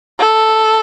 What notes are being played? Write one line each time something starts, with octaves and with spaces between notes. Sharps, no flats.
A4